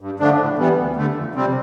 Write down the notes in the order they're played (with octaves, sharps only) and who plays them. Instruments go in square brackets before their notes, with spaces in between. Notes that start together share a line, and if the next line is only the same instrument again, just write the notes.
[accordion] G2
D3 F3 A3 D4
A2
E3 G3 B3
D2
D3 A3
F2
C3 G3 C4